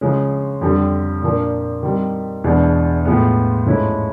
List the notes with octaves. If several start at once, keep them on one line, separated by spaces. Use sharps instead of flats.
C#3 F3 G#3 C#4
F2 D3 G3
A#2 F3 A#3 D4
D#3 G3 C4
E2 B2 G#3 B3 D4
A2 F3 G#3 B3
G#2 F3 A3 C#4 E4